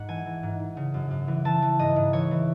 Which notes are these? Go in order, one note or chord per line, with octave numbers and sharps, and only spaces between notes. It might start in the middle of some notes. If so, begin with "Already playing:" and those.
Already playing: G#2 F#5
E3 G#5
E3
G#2
G#2
C#3
F#2
F#2
E3
E3 A5
E3
G#2 D#5
G#2
E3 C#5
E3